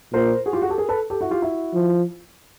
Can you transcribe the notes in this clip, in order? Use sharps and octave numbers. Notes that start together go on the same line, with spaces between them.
A#2 A#4 C5
F#4 G#4
F4 G4
F#4 G#4
G4 A4
G#4 A#4
A4 B4
G4 A4
E4 F#4
F4 G4
E4 F#4
F3